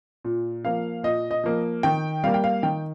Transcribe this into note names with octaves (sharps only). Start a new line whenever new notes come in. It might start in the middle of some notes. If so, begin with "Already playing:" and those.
A#2
F3 A#3 F5
A#2 D#5
D#5
F3 A#3
D#3 G5
G3 A#3 F5
G5
F5
D#3 G5